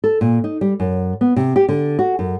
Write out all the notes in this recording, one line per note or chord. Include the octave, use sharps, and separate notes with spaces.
A4
A#2
D#4
G3
F#2
B3
C3
G4
D3
F#4
F#2